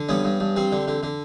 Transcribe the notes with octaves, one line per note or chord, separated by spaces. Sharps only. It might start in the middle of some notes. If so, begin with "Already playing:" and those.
Already playing: D3
G2 B3 C#4
G2
G2
G3 C4
D3
D3
D3